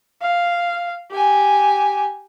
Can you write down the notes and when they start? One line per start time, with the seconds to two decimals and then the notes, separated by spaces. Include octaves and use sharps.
0.21 F5
1.12 G4 G#5